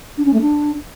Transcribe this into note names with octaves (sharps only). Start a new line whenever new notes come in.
D4
C#4
A3
D4